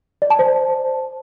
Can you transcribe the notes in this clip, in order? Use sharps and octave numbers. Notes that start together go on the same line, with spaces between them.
D5
A5
C5